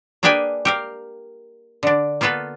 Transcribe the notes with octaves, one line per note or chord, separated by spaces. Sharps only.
A#3 D4 G#4 B4 G5 G#5
G4 A#4 F5
D3 D4
A#3 B3 F4 A4 B4